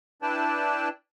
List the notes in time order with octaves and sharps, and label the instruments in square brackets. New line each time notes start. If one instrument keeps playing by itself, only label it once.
[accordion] D4 E4 B4 D5 G5 A5